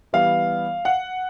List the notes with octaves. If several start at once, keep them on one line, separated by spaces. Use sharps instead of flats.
E3 G3 B3 F5
F#5